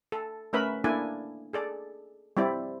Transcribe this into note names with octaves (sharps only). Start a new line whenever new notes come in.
A4
A3 C#4 A#4 B4 E5 B5
A#3 D4 E4 A4 D5 G#5
G#4 A4 D5
G3 C4 E4 D5